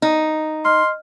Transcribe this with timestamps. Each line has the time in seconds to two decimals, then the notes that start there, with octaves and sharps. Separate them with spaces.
0.02 D#4
0.65 D#5 C6 F6